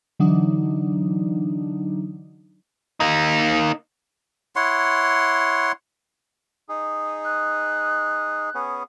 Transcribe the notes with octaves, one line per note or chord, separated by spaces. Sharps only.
D3 E3 F#3 D4 D#4
A#3 D#4
E4 C#5 F#5 C6
D#4 G#4
F#6
B3 C#4 G#4